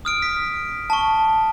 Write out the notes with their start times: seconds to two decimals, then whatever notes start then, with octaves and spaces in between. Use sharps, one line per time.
0.05 D#6 F6 D7
0.22 B6
0.90 A5 C#6